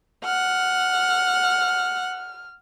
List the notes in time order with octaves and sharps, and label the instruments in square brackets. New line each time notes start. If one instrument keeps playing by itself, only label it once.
[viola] F#5 [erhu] F6